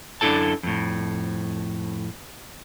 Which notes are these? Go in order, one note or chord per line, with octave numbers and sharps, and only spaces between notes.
F#2 D4 E4 A4 A5
F2 A2